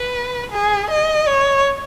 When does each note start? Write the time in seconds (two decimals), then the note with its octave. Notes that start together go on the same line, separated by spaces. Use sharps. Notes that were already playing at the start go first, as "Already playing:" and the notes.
Already playing: B4
0.52 G#4
0.90 D#5
1.27 C#5